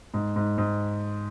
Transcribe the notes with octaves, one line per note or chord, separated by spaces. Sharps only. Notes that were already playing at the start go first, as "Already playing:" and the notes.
G#2
G#2
G#2